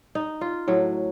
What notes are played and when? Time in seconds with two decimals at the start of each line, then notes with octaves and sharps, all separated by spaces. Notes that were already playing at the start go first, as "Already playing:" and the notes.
0.15 D#4
0.41 F4
0.68 A2 F#3